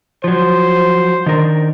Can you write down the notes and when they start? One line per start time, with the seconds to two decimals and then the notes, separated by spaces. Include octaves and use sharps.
0.24 F3 F#3 C5
1.26 D#3 D4 A#4